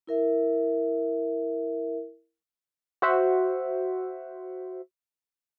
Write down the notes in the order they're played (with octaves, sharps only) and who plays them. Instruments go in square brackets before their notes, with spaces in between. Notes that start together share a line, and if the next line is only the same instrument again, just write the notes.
[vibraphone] E4 A#4 E5
[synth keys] F#4 C5 E5 F#5